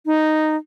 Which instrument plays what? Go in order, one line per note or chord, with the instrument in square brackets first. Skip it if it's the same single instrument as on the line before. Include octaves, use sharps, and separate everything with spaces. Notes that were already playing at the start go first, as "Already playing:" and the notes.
[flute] D#4